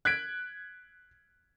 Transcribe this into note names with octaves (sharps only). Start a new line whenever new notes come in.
F#6 G#6 B6 D7